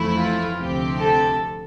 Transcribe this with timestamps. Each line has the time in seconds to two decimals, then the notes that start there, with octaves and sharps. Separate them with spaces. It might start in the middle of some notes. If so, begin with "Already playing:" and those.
Already playing: F2 E3 A3 E4
0.17 F4
0.58 D2 C3 F3 C4 G4
0.99 A4